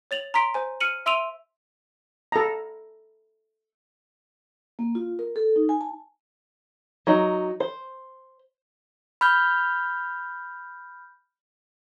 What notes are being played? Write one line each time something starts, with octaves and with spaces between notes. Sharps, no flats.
C#5 A6 F7 F#7
A#5 C6 B6 D7
C5 G#5
F6 C#7 D#7 F#7
E5 C6 E6 D7 D#7 F7
A4 A#5
A#3
F4
A#4
A4
D#4
G#5
A5
F#3 D#4
C5
B5 F6 G6